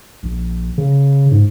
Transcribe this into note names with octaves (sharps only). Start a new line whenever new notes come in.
A#1
C#3
G#2